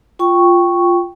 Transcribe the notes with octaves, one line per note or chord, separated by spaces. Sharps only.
F4 G5 C#6